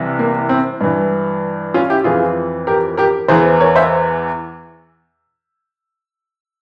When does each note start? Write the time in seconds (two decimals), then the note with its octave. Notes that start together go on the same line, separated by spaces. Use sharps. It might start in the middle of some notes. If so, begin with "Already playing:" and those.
Already playing: C2 C3 E3
0.19 A#3
0.49 C4
0.81 G2 E3
1.74 C#4 F4
1.90 E4 G4
2.04 F2 E3 F4 G#4
2.67 G4 A#4
2.97 G4 A#4
3.28 E2 E3 G#4 C5
3.60 A#4 C#5
3.76 C5 E5